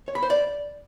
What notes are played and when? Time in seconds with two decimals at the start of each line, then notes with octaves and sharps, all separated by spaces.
0.08 C#5
0.15 B5
0.23 C5
0.30 D5